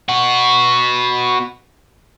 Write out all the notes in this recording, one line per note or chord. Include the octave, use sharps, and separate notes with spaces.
B3 F#4